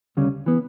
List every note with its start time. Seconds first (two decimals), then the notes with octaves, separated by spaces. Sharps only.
0.17 D2 C#3 G3 C#4
0.46 E3 B3